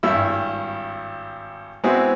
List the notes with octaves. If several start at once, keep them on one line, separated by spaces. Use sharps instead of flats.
G#1 G2 E4 E6
G#3 B3 C4 E4 F#4